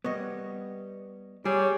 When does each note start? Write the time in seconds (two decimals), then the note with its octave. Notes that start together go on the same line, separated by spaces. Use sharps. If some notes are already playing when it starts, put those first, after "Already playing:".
0.04 G3 B3 C#5 D#5
1.45 G3 G4 G#4 C#5